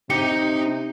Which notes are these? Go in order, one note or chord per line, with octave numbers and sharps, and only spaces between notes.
C3 D#4 G4 C#7